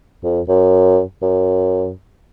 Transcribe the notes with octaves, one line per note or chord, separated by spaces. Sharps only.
F2
F#2
F#2